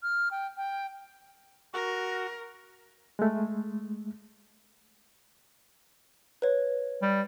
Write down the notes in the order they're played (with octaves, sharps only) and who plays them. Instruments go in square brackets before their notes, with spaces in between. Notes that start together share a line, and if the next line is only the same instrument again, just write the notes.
[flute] F6
G5
G5
[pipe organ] F#4 [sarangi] A#4
[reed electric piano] G#3 A3
[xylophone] B4 C#5
[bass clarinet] G3